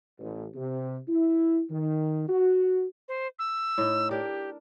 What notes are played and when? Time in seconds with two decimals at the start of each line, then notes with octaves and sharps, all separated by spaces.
0.19 A1
0.55 C3
1.08 E4
1.70 D#3
2.29 F#4
3.08 C5
3.39 E6
3.78 A2 D#4
4.11 D4 G4 A#4